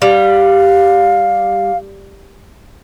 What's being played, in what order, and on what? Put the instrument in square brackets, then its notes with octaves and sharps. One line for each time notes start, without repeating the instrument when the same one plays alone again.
[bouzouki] G3 [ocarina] F5